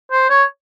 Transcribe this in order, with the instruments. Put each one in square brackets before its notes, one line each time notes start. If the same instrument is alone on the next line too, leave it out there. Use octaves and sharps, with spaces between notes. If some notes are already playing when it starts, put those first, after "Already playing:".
[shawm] C5
C#5